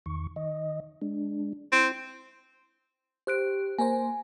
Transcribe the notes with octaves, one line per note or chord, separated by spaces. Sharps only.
E2 D#3 C#6
D#3 D#5
G#3 D4
C4 E4
G4 C5 F#6 D7
A#3 A#4 C5 G#5